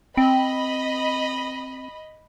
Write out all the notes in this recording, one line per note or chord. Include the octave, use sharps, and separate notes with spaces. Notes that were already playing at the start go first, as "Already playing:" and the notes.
C4 D#5 B5